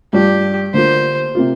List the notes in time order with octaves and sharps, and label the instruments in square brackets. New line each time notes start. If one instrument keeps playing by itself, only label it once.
[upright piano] G2 F3 D4 F4 [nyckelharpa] G4
[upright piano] D3 A#3 F4 [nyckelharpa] C5
[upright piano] C3 A#3 F4